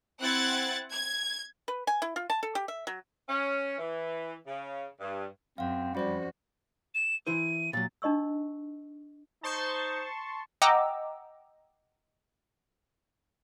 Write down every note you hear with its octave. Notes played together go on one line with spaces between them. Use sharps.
C4 E4 F#5 F#6 G#6 A6
G#6
B4
G#5
E4
F4
A5
A4
G4
E5
F#3
C#4
E3
C#3
G2
F#2 C4 F5 F#5
F2 G3 C#4 F#4 C5 D5
E7
E3 E4 C5 D#7
A#2 F#3 A6
D4 D#4 D#5 C#6 E6
D#4 C5 A5 C6 C#6
D#5 F#5 G5 A#5 D6 E6